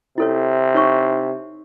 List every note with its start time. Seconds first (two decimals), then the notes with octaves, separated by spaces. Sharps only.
0.18 C3 E4 A4 C#5
0.75 D#4 C#5 C#6